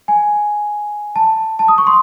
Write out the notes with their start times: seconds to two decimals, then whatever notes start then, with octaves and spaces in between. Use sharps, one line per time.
0.08 G#5
1.16 A5
1.59 A5
1.68 D#6
1.78 C#6
1.87 C6